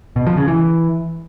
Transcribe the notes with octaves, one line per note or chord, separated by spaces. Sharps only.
B2
F3
C#3
E3